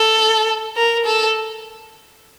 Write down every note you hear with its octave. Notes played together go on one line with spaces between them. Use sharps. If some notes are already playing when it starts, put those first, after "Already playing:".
Already playing: A4
A#4
A4